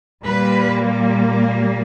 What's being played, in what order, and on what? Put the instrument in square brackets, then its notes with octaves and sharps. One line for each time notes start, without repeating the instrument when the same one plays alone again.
[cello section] A#2 G3 A#3 B4